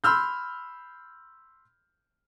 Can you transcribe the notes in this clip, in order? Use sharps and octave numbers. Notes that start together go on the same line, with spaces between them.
B5 C6 E6 F6 G6